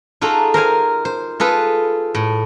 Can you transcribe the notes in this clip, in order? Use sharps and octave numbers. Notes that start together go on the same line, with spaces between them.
D#4 F4 F#4 G#4 A4
A#4 C5 F5 G#5
C5
F4 G#4 A4 B4
A2